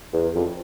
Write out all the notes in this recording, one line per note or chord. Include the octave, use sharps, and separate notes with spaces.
E2
F2